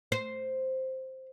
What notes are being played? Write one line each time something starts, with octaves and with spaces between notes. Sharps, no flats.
C5